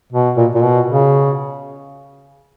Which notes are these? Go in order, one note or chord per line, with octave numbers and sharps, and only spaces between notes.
B2
A#2
A#2
B2
C#3